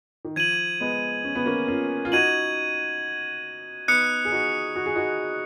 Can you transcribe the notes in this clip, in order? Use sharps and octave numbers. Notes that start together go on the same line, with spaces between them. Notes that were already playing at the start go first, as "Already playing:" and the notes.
D#3
F3 G#6 D#7 F#7
G#3 B3
C#4
B3
A#3 C#4
C#4 F4
F4
D#4 F#4 G#6 D#7 F#7
B3 D#4 D#6 F#6 C#7
G#4
D#4 F#4
F#4
G#4
D#4 F#4